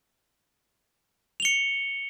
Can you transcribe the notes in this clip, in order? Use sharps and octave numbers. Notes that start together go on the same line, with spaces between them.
C#7 F7 G7